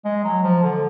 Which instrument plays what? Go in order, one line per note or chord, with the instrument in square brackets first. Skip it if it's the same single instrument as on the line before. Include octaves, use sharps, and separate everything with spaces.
[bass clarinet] G#3
F#3
F3
D3